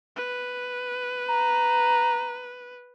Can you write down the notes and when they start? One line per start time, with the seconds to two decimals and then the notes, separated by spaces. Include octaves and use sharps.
0.16 B4
1.30 A#5